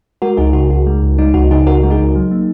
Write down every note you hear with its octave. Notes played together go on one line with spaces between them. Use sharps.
G#3 F#4 A#4
C#2 D#4 G#4
C#3 F#4
C#2 F#4
G#3
C#2
G#3 D#4
C#2 F#4
C#3 D#4 G#4
C#2 F#4 A#4
G#3
D#4 G#4
C#2
F#3
A#3